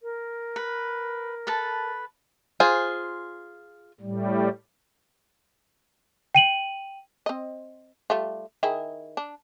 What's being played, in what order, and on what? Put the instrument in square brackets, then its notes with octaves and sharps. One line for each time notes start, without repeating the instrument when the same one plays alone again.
[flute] A#4
[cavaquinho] B4
A4 B4 A5
[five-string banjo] F4 G#4 C5
[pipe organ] A2 G3
[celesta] G5 D#7 F#7
[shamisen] C4 D#5
G3 A3 F4
D#3 E4 G#4
D4